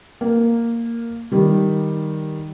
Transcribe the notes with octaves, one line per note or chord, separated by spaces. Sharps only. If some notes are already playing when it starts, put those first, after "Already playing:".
A#3
D#3 G3